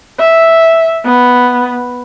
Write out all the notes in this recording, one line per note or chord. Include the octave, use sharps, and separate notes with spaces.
E5
B3